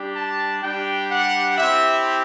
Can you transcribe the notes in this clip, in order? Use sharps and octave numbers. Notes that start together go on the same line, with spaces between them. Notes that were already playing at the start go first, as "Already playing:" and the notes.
Already playing: G3 D4 G4
A5
G3 D4 G4 G5
F#5
C4 E4 G4 E5